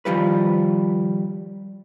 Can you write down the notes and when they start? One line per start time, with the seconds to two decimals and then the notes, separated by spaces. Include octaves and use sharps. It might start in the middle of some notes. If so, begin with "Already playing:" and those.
0.05 D#3 F3 G3 B4